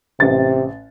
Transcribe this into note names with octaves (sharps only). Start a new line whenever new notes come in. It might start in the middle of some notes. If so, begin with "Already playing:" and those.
A1 C3 A6